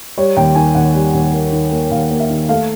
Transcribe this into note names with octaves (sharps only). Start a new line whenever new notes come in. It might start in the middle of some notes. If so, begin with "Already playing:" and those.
G3 C#5
D#2 G5
D#3 G#5
D#2 F#5
G3
D#2
A#3
D#3
A#3
D#2 F5
A#3
E5
D#3
A3 F5